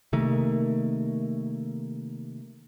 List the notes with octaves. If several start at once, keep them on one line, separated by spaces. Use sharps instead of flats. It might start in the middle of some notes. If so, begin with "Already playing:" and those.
C3 D#3 A3 A#3